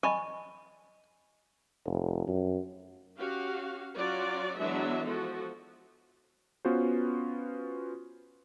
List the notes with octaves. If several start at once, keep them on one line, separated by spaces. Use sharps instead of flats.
D#5 G#5 B5 C#6
F1
F#2
C#4 F#4 G4 F5
F#3 C#4 F4 F#4 D5
E3 F#3 G#3 B3 D4 E5
F3 F#4 A4
B3 C#4 F4 F#4 B4 C5